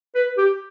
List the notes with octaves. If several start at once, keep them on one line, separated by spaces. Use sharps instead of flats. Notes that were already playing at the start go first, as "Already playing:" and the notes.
B4
G4